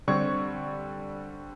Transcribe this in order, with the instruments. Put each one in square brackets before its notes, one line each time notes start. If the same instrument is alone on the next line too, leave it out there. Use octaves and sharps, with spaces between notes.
[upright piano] D3 G3 C4 C#6 G#6